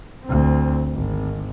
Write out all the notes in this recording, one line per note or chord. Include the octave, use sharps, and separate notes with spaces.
D2 C4
G#1